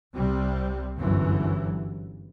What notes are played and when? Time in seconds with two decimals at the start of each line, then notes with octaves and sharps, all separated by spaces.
0.13 C2 C3 G3 C4
0.97 G1 F#2 E3